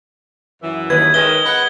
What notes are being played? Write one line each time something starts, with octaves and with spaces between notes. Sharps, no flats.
F#2 E3
D#2 B4 D#5 G#6
D#3 G#3 C#4 B4 D#5 G7
B4 F#5